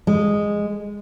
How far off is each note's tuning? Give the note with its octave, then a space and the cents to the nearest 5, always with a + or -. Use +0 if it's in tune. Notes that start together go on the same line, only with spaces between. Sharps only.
G#3 -10